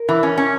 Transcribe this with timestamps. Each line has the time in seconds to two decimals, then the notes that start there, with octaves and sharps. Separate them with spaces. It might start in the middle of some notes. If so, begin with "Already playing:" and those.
Already playing: A#4
0.09 E3
0.23 C#4
0.37 C#4